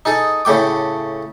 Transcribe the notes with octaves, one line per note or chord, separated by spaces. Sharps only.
D#4 G#4 A4
A2 C#3 A3 G5 D6